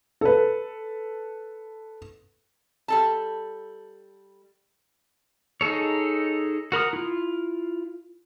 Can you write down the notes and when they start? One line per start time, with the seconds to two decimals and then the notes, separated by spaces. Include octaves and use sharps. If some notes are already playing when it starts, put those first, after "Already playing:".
0.21 A4 B4
2.88 G3 A4 A5
5.61 D#4 G#4 A4 C#5
6.72 F#4 A#4 B5 D#6
6.93 E4 F4